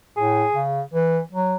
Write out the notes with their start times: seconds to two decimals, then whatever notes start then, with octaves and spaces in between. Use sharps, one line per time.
0.17 A2 G#4
0.55 C#3
0.93 E3
1.32 F#3